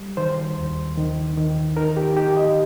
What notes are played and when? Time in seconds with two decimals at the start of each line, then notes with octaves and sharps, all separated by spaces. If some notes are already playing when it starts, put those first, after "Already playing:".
Already playing: G3
0.17 D#3 C5
0.57 D#2
0.97 D#3
1.37 D#3
1.77 D#4 A#4
1.97 G4
2.17 D#4 G4
2.37 D#5